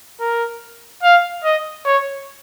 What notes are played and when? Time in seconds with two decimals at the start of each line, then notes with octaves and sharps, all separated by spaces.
0.20 A#4
1.03 F5
1.44 D#5
1.85 C#5